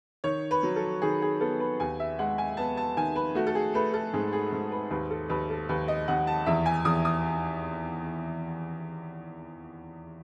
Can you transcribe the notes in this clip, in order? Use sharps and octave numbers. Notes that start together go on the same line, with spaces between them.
D#3 C#5
B4
F#3
A4
D#3 G#4
G#4
B3 A4
B4
D#2 G#5
E5
G#3 F#5
G#5
B3 A5
A5
D#3 G#5
B4
A3 F#4
A4
G#4
A3 B4
A4
G#2 G#4
G#4
G#2
B4
D#2 B4
A4
D#2 B4
A4
D#2 B4
D#5
D#2 F#5
A5
E2 E5
G#5
E2 D#6
D#6